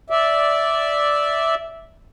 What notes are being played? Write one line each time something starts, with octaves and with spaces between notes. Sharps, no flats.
D5 E5